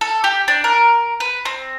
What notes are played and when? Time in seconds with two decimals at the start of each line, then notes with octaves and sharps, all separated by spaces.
0.01 A4
0.24 G4
0.48 D4
0.64 A#4
1.20 B4
1.45 C4